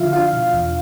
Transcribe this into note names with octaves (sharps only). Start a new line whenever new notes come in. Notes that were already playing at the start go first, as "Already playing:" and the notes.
Already playing: D3 F3 E4 F4 E5 F5
D4 F4 F5
B2
E2